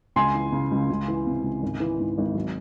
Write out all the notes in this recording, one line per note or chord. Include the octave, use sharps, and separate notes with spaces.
C#2 G#5 C6
E3
C#3
C#2
C#2
E3
C3
C#2
G#1
E3
G#2
G#1
F#3